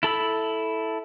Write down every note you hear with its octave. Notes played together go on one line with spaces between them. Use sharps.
E4 A4 B5 E6